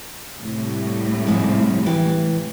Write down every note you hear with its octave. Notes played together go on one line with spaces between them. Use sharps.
C2 A2
G#2 F3
E3 G4